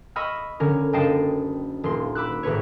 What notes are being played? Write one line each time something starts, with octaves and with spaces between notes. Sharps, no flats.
D#5 B5 C#6 E6 F6
D3 C#4 A#4
F#1 D4 D#5 G5 A5 C7
D#1 A#2 C6
B5 D6 E6 F#6
G#1 A2 B4 C#5